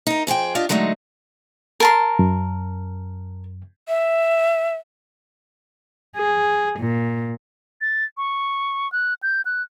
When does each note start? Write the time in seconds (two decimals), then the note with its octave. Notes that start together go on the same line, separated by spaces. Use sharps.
0.07 D#4 A#4
0.27 F2 G#4 C5 G5
0.55 D4 F4 G4 D#5
0.69 D3 F#3 G#3 A3 D#4
1.80 A#4 A5 C6
2.19 F#2
3.88 E5
6.17 G#4
6.80 A#2
7.81 A6
8.17 C#6
8.92 F#6
9.23 G6
9.45 F#6